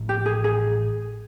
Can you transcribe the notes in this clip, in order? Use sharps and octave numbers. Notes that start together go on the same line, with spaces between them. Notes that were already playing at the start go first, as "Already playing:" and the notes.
Already playing: A1 A2 F3
G4
G#4
G#4